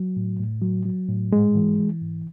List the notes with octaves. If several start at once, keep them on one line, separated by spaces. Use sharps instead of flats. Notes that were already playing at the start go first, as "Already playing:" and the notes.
Already playing: F#3
A2
A2
F#3
F#3
A2
G#2 G#3
E3
E3
G#2